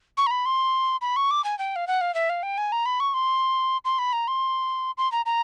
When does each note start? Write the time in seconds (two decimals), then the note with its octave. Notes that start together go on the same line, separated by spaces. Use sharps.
0.17 C#6
0.27 A#5
0.31 B5
0.46 C6
1.01 B5
1.16 C#6
1.31 D6
1.44 G#5
1.59 G5
1.76 F5
1.87 F#5
2.01 F5
2.15 E5
2.29 F5
2.43 G5
2.58 G#5
2.72 A#5
2.86 B5
3.00 C#6
3.14 C6
3.85 C6
3.99 B5
4.13 A#5
4.28 C6
4.97 C6
5.12 A#5
5.26 A#5